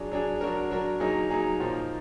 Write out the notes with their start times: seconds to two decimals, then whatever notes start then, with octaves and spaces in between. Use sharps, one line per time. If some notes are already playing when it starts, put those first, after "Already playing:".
Already playing: F#3 D4 G#4
0.11 F#3 D4 G#4
0.41 F#3 D4 F#4 A#4
0.70 F#3 D4 F#4 A#4
1.00 F#3 A#3 D#4 G#4
1.30 F#3 A#3 D#4 G#4
1.60 A#2 F3 A#3 D#4